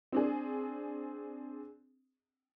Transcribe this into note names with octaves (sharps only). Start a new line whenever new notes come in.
C4 D4 G#4